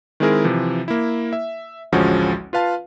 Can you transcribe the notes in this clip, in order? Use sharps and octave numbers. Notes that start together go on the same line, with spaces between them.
D#3 G#3 C4 E4 G#4 A#4
C3 E3 F3
A#3 E4
E5
A1 D2 F3 G#3 C#4 F#4
F4 B4 F5 A5